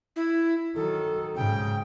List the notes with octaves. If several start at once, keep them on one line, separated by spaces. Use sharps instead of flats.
E4
D#3 F#3 A4
G#2 C#3 G5